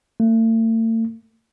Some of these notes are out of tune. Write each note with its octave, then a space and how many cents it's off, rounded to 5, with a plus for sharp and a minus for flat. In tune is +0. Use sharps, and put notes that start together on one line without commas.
A3 +40